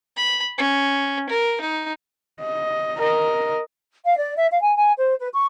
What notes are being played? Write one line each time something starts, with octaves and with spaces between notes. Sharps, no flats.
B5
C#4
A#4
D#4
D#5
A#4 D#5
F5
D5
E5
F5
G#5
G#5
C5
B4
C#6